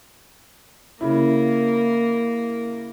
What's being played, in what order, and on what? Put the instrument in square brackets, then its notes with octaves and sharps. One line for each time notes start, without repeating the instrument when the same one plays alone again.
[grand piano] C#3 E4 [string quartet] A#3